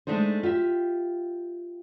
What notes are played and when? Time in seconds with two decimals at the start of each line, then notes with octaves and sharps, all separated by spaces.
0.07 G#3 A3 D4 D#4 C5
0.43 F4 G4 E5